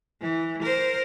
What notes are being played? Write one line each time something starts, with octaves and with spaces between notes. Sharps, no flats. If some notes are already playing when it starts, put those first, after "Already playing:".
E3
A#4 C5